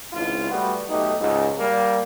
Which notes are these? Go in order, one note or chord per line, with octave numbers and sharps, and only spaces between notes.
G#1 C#2 E4 F4
G3 A3 B3 F#4
B1 A3 D#4 G4
C#2 G#2
G3 A#3